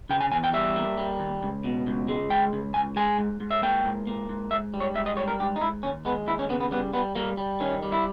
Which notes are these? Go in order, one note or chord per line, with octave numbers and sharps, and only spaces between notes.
C#3 G5
G#5
E2 G#5
G5
G3 E5
A#3
G3
D#2
C#2
B2
C#2
G#3
C#2 G5
C#2
C#2 G#5
G#3 G#5
G#2
G#2
E5
A#3 G5
G#2
A#3
G#2
G#2 E5
G3
C#5
G#2 E5
D#5
G3 C#5
A#4
G#2 G4
D#4
G#2 E4
D#2 C#4
G#3 B3
D#2 E4
C#4
C#3 B3
B3
G3 B3
G3 B3
G3 A#3
G3
D#3 C#4
G3
E4